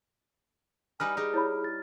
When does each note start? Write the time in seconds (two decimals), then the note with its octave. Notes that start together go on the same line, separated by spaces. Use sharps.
1.00 G3 D#4 B4 G#5 F6
1.17 D#4 G4 G#4
1.34 E4 C#5 B5
1.64 A6